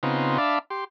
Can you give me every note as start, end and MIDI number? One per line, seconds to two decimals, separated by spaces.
0.03 0.38 49
0.03 0.38 59
0.03 0.38 60
0.03 0.38 63
0.03 0.38 65
0.38 0.59 62
0.38 0.59 74
0.38 0.59 76
0.38 0.59 77
0.38 0.59 81
0.38 0.59 83
0.70 0.84 67
0.70 0.84 84